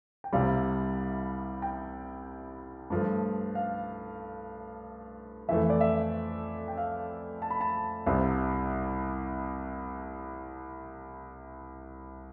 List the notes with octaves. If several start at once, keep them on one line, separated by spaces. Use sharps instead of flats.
G5
C2 C3 G3 F5
G5
G2 F3 A3
F5
F2 E3 A3 E5
D5
E5
G5
F5
A5
B5
A5
C2 C3 G3